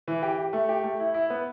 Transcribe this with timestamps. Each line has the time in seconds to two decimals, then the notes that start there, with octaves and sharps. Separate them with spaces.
0.08 E3
0.23 G4
0.38 G4
0.53 A3
0.69 G4
0.84 A3
1.00 E4
1.14 E4
1.30 B3